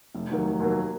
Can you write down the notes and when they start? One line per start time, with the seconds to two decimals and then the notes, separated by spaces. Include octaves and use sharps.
0.15 F1
0.29 D#2 D#3 F#3 A#3
0.46 F1
0.60 D#2 D#3 F#3 A#3